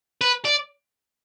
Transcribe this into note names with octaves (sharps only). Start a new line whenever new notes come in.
B4
D5